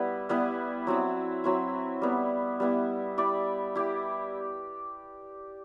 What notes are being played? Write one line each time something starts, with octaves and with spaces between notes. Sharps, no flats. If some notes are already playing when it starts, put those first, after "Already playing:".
Already playing: G3 B3 E4 B4
G3 B3 E4 B4
F#3 C4 E4
F#3 C4 E4
G3 B3 E4
G3 B3 E4
E4 G4 D5
E4 G4 D5